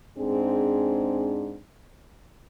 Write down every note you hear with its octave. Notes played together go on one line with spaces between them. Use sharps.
G#2 C4 D4 G#4